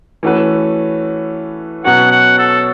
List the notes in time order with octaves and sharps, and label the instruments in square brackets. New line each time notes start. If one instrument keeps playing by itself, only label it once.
[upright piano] E3 A3 C#4 F#4 B4
[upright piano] B2 F#3 C#4 F#4 C#5 [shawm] F#5
[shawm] F#5
A4